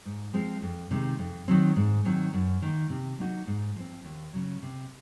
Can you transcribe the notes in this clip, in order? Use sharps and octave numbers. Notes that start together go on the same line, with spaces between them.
G#2
F3 G#3 C4
F2
C3 D#3 G#3
F2
D#3 F#3 C4
G#2
D#3 F#3 C4
F#2
D#3 A#3
C3
F#3 A#3 D#4 F#4
G#2
F3 C4
D#2
C#3 F#3
C3